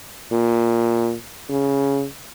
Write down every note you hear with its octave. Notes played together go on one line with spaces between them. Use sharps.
A#2
C#3